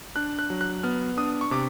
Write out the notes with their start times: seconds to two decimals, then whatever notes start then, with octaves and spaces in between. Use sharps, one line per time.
0.16 D4 F#6
0.39 F#6
0.50 F#3
0.61 F#6
0.83 B3 F6
1.17 D4 D#6
1.41 C#6
1.51 C3 D6